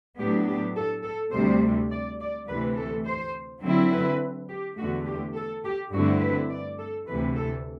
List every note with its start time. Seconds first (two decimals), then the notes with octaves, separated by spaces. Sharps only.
0.18 A2 F#3 B3 D4 G4
0.47 G4
0.76 A4
1.04 A4
1.33 D2 C3 G3 C5
1.91 D5
2.20 D5
2.48 D2 C3 E3 A3 B4
2.76 A4
3.06 C5
3.63 D3 F#3 C4 E4
3.92 B4
4.49 G4
4.77 E2 D3 A3 F#4
5.06 G4
5.35 A4
5.64 G4
5.92 G2 D3 A3 C4 E4 F#4
6.21 B4
6.50 D5
6.78 A4
7.07 D2 C3 E3 B4
7.36 A4